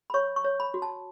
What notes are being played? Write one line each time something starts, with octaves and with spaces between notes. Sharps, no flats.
B5
C#5 C#6
C#6
C#5
B5
F#4
A5